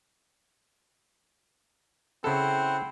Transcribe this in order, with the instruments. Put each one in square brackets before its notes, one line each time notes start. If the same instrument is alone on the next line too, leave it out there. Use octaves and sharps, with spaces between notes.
[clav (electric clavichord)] C#3 A4 [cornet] C4 [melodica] E4 F#5